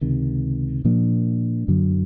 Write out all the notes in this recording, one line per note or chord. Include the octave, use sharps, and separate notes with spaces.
C#2 C3 D#3
A#2 F3 A#3 D4
F#2 D3 F#3